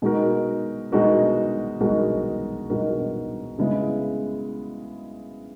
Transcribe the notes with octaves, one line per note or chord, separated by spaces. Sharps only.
B2 G#3 D#4 F#4 A#4
B2 G#3 D#4 F#4 A#4
B2 G#3 D#4 F#4 A#4
B2 G#3 D#4 F#4 A#4
C#3 G#3 B3 E4